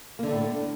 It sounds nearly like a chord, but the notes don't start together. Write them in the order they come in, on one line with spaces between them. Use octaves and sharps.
A#3 D3 A3 A2